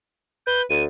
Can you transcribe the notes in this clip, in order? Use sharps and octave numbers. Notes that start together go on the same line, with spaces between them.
B4 G6
D2 D#7